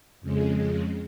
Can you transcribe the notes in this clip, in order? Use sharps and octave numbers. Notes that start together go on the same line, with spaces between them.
F2 C#3 G#3